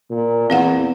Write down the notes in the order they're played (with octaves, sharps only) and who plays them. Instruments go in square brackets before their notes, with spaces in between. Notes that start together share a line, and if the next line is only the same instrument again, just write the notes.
[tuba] A#2
[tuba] E2 [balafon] C4 F5 F#5